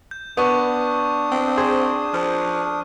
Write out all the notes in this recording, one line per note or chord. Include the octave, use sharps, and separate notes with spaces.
G6
B3 D4 C#6 D#6 G6
C4
G#4 C5
F3 F6